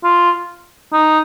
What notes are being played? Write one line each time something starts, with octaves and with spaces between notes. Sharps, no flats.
F4
D#4